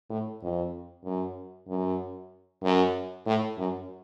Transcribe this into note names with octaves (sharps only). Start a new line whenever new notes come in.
A2
F2
F#2
F#2
F#2
A2
F#2